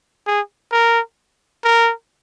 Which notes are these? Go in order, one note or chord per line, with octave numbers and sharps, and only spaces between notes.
G#4
A#4
A#4